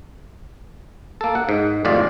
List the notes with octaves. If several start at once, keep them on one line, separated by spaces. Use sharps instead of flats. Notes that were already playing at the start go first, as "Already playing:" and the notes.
A#3 A4
F#5
G#2
G#1 F2 A2 C3 D5 F5